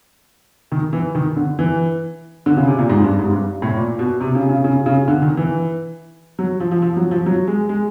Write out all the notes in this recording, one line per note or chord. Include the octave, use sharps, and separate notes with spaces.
D#3
E3
D#3
D3
E3
D3
C#3
C3
A#2
G#2
G2
G#2
G2
A2
A#2
B2
C3
C#3
C#3
C#3
C#3
D3
D#3
E3
F#3
F3
F3
F3
F#3
F3
F#3
G#3
G#3